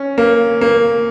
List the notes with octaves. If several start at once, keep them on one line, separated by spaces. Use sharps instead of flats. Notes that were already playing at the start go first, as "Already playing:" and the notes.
Already playing: C#4
A#3
A#3